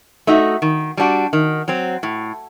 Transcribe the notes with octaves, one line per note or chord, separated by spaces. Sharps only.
A3 D#4 F#4
D#3
G3 D4 F#4
D#3
F#3 C4
A2